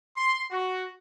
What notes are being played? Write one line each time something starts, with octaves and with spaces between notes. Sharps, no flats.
C6
F#4